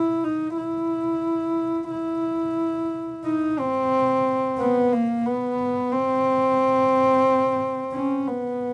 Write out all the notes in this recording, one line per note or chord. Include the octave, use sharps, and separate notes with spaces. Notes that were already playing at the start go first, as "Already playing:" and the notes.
Already playing: E4
D#4
E4
E4
D#4
C4
B3
A#3
B3
C4
C#4
B3